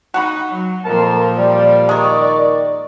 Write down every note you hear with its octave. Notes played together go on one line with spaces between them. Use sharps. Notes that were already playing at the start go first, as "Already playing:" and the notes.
D#4 F#4 F#5 B5
F#3
F2 A#2 F3 A#4 A5
G3 D5
D#3 G#3 A#4 C#6